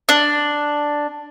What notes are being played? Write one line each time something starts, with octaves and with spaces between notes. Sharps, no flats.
D4